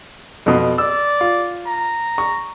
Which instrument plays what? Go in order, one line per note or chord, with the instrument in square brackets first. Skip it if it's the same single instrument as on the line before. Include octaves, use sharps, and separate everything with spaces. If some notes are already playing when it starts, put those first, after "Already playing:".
[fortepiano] F2 B2
[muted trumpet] D5 [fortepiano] E6
[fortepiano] F4
[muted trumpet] A#5
[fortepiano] C#6